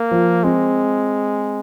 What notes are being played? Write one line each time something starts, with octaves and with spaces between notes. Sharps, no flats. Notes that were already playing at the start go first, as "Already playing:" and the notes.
Already playing: A#3
F3
G#3 C4